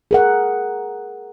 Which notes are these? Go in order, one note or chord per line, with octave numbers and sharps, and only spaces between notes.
G#4 A#4 F#5